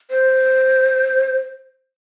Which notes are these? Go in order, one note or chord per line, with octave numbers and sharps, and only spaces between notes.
C5